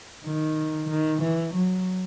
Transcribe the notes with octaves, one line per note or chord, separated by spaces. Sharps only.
D#3
D#3
E3
F#3